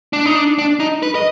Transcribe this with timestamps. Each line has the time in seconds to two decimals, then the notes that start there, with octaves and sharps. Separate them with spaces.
0.13 D4
0.26 D#4
0.36 D4
0.59 D4
0.80 D#4
1.03 B4
1.15 D#5